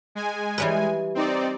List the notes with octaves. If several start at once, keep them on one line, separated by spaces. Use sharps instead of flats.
G#3 G#5
E3 G3 B4
C4 D#4 D5